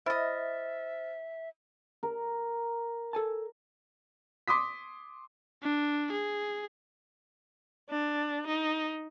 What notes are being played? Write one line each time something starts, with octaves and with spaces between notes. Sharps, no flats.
E4 C5 D#5 E5 F6 A6
A#4
A4 G#5 A5
C6 D6 D#6 B6
D4
G#4
D4
D#4